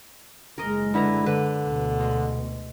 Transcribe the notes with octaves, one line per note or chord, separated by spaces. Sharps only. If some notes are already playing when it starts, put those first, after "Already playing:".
F#1 G#3 A#4 D#5
D3 E4 B4 A#5
D3 B4
D2 B2
G#3